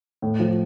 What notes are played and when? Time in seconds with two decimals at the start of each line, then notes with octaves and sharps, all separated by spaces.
0.22 A2
0.40 F3